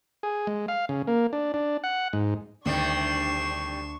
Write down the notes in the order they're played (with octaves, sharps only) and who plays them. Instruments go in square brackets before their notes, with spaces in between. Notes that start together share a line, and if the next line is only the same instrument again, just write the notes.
[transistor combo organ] G#4
G#3
F5
C#3
A#3
D4
D4
F#5
G#2
[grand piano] D2 [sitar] C3 D#3 G3 [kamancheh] D4 C#6 [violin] C7 E7